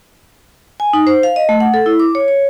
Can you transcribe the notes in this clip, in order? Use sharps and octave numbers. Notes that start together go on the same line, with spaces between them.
G#5
D#4
C5
F5
D#5
A3
F#5
A4
E4
D6
C#5
C#5